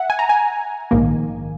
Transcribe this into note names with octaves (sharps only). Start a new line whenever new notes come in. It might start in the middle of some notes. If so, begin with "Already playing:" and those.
Already playing: E5 F#5
G#5
A#5
G#5
A#1 G#2 D#3 A#3